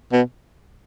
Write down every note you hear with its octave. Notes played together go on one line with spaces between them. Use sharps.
B2